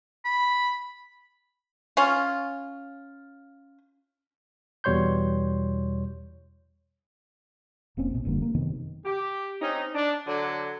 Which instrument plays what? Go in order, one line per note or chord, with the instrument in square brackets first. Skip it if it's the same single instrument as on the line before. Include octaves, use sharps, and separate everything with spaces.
[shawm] B5
[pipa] C#4 F4
[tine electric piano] E2 B2 G3 C#5 C6 G6
[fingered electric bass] F1 A#3 C4 C#4
A#1 B2
F1 G2 D3 A#3
A#3
F#2 C3 D#3 B3
[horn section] G4
C4 C#4 D#4
D4
D3 F#3